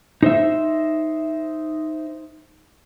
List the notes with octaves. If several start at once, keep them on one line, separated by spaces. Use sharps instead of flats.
D#4 C5 E5